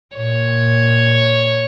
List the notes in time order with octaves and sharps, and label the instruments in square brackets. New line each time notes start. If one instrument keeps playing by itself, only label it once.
[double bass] A#2 [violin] C#5